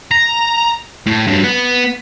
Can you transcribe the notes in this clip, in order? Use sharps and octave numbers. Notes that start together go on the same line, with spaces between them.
A#5
A2
G2 F#3
B3